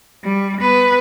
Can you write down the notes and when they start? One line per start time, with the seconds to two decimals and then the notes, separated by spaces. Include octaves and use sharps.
0.24 G3
0.61 B3 B4